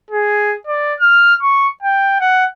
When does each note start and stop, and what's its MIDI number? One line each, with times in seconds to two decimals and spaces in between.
0.11 0.56 68
0.67 0.94 74
1.00 1.35 89
1.42 1.68 85
1.83 2.19 79
2.20 2.45 78